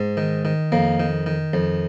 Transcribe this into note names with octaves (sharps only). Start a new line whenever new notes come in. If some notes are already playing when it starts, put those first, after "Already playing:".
Already playing: G#2
D#3
D#3
F2 A#3
D#3
D#3
F2